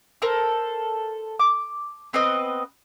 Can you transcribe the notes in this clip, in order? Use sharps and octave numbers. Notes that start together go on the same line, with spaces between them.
A4 A#4 C5
D6
B3 C4 B4 D#5